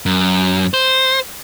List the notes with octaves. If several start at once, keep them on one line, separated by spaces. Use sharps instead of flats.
F#2
C5